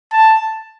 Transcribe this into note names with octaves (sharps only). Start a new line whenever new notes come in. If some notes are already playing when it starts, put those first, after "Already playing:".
A5